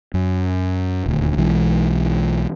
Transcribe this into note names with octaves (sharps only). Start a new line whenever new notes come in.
F#2
D#1 D2
B1 E3 G#3